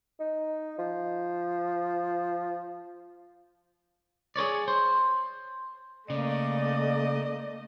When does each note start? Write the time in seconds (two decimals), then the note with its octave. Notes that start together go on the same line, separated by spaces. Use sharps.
0.20 D#4
0.79 F3
4.36 G#4 B4 C#5 D5
4.68 C5
6.10 C#3 A3 A#3 D5 D#5